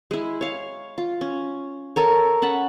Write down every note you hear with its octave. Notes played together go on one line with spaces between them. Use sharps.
G#3 E4
C#5 F5
F4
C#4
A4 A#4 C#5
C#4 F#5 A5 B5